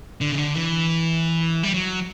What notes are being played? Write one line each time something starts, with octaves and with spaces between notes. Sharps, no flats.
D3
C#3
D3
E3
G3
F#3